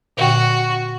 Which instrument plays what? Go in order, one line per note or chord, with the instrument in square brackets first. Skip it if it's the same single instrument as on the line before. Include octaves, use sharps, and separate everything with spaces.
[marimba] A#2 D3 G5 [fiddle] F#4